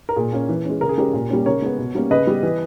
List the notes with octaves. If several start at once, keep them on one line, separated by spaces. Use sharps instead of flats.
A#4
A#2 G#4
A#3 C#4
E3
G#3 C#4
C#3 A#4
G#4
G#3 C#4 G4 A#4
A#2
G3 A#3 C#4
C#3 A#4 C#5
G#3 B3
B2
G3 A#3 C#4
C#3 B4 D#5
G3 B3
E3